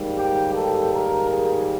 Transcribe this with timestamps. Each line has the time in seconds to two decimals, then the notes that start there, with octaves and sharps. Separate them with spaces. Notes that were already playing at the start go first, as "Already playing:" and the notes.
Already playing: G#2 D#3 G3 A#3
0.17 G4
0.55 A4
0.93 A#4
1.31 G#4